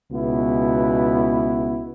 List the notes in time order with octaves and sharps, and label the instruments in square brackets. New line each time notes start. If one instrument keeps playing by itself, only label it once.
[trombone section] C#2 B2 B3 E4